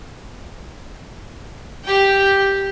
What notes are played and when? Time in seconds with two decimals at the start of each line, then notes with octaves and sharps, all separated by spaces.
1.84 G4 G5